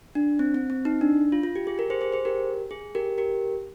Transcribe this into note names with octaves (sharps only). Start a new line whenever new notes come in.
D4
C4
C4
C4
D#4
D4
F4
F4
G4
G#4
G4 A#4
G#4 C5
G#4 C5
G#4 C5
G4 A#4
G#4
G4 A#4
G4 A#4